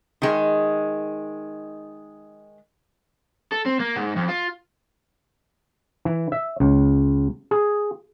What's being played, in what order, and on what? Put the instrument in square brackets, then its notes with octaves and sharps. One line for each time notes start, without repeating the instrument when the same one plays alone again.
[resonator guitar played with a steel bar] D#3 G#3
[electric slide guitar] A4
C4
A#3
G#2
F2
F4
[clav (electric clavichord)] E3
E5
C#2
G#4